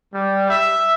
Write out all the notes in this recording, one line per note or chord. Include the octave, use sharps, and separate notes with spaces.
G3
E5